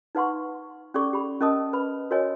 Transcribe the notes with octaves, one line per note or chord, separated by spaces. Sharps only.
D#4 B4 F#5 C6 C#6
C#4 G4 A4 D5 C#6 D6
G4 B5
C#4 A#4 D#5 A5 D#6
B4 B5
F#4 A#4 C#5 D#5 G#5